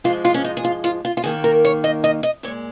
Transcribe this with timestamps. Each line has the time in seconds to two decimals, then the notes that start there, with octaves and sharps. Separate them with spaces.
0.04 G#2 F3 G#3 F4
0.25 F4
0.34 C#4
0.44 D#4
0.57 G#4
0.65 F4
0.84 F4
1.05 F4
1.17 F4
1.24 D#2 D#3 A#3 G#4
1.44 A#4
1.65 C#5
1.84 D#5
2.04 D#5
2.23 D#5
2.43 A#2 C#5
2.48 G#3